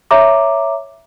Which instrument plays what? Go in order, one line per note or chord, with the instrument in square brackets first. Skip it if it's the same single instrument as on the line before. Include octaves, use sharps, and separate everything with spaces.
[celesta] C#5 E5 A#5 D6